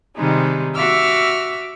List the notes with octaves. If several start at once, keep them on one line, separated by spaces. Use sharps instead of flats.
C3 D#3 G3 G#3 D#4
F#4 E5 D6 E6 F6